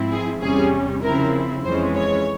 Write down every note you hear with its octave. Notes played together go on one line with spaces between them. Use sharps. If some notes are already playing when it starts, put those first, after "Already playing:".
Already playing: G#2 F3 C4 E4
G#4
E2 C3 G3 C#4 G#4
C#3 F3 C4 E4 A#4
F2 E3 G#3 C#4 C5
C#5